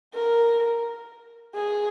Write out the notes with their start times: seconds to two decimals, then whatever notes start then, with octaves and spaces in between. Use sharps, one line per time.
0.14 A#4
1.55 G#4